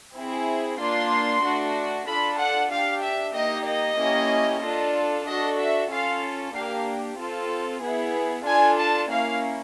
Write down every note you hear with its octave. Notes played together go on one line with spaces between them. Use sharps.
C4 E4 G#4
A#3 D4 F4 C6
A3 D4 F#4
D4 F4 A4 B5
F#5
D4 G4 F5
E5
A#3 D#4 G4 D#5
D#5
A#3 C#4 E4 G4
D4 F4 A4
D4 F#4 A4 D#5
E5
C#4 F4 A4 F5
A#3 D4 G4 F5
C4 F4 A4
B3 E4 G#4
D4 F4 A4 G#5
A5
A#3 C#4 E4 F5